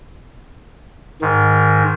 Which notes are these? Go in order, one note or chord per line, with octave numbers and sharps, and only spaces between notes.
G#2 D#3